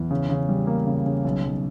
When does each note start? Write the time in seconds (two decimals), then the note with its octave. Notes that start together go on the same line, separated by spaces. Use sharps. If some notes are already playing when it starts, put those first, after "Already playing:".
Already playing: E2
0.11 C#3
0.30 C#3
0.49 G3
0.67 A#3
0.87 C#3
1.06 C#3
1.24 B1
1.43 B1